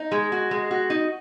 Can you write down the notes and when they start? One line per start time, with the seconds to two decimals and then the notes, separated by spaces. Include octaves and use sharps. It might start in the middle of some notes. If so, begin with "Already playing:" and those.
Already playing: D#4
0.12 G#3
0.32 F#4
0.51 G#3
0.71 F#4
0.90 D#4